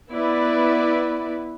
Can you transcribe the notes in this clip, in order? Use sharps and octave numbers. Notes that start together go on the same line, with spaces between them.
B3 E4 B4 D5